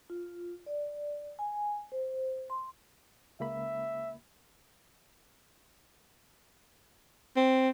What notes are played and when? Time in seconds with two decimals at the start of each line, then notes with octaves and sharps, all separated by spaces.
0.10 F4
0.66 D5
1.39 G#5
1.92 C5
2.50 C6
3.40 C#2 A#3 E5 B5
7.36 C4